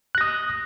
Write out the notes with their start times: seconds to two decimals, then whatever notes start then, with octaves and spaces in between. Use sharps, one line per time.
0.15 F#6
0.18 A#6
0.21 D#6